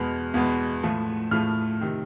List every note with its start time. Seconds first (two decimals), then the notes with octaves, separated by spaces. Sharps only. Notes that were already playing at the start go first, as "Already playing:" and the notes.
Already playing: E2 B2 G#3 B3 F6
0.34 E2 B2 G#3 B3
0.83 A2 F3 A3
1.31 A2 F3 A3 F6
1.81 C3 D#3